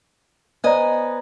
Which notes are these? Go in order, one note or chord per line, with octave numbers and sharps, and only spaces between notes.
B3 C5 D5 D#5 G#5 A#5